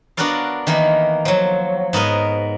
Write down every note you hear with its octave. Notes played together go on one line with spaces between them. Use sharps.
B3 D4 F#4 A#4 D5 F5
D#3 E3 A#3 B3
F3 F#3
G#2 B3 A#4 D#5